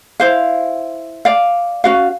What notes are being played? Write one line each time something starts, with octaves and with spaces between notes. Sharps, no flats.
E4 C5 F5
D5 F5
C#4 F#4 F5